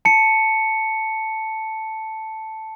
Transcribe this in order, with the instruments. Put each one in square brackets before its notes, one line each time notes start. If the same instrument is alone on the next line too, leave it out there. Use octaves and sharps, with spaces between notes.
[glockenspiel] A5 C#7